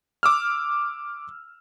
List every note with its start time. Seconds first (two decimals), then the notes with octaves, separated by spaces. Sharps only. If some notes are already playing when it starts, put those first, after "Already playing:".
0.23 D6 E6 F6